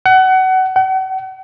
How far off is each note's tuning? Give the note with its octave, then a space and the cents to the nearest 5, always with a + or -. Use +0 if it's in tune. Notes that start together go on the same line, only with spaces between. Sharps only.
F#5 +25
F#5 +40